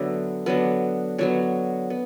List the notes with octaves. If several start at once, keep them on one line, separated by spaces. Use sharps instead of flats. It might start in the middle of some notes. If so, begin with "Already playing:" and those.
Already playing: D3 F#3 B3 E5
D3 F#3 B3
D3 F#3 B3 C#5
B3